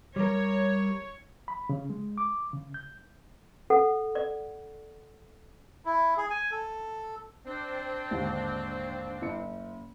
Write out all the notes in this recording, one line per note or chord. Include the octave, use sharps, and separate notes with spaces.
G3 A#4 C#5
B5
C#3
G#3
D6
C#3
G6
A4 F#5
D5
E4
G#4
G#5
A4
C4 D4
D#2 G#2 D3
F#1 C#7